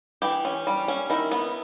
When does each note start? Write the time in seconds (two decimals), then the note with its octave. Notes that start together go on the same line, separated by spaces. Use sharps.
0.22 E3 G4
0.45 C#4
0.67 G3
0.88 C#4
1.10 D#3 E4
1.31 B3